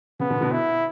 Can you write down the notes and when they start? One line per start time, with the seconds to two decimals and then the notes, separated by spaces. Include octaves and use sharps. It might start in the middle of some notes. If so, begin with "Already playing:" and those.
0.20 C#3 B3
0.30 B2 D3
0.41 B2 D3
0.52 E4